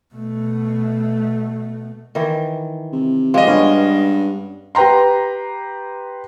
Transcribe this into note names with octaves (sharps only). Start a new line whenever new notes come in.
B2 A3
D#3 E3
C3
F3 G#3 G4 D#5 C6
G2 B3 C#4
G4 B4 G5 A#5 C6